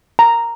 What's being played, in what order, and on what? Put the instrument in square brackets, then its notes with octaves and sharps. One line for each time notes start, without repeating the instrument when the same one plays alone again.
[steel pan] A#5